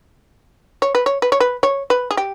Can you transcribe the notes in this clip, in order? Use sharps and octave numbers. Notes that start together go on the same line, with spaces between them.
C#5
B4
C#5
B4
C#5
B4
C#5
B4
G#4
G4